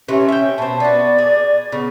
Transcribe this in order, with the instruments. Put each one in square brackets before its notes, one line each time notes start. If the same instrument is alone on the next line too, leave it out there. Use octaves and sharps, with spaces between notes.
[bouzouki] C3 E3 A3 [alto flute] C#4
[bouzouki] E5 G5
[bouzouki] B2 C4 [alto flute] A5
[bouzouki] B3 F#4 [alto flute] D5
[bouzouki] G#4
[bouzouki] C#3 [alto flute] B3